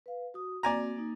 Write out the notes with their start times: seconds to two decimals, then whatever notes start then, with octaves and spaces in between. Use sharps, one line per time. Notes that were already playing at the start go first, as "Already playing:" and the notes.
0.06 B4 F5
0.34 F#4 D#6
0.63 A#3 C4 F#4 D5 G#5 A#5
0.96 A#3 D#4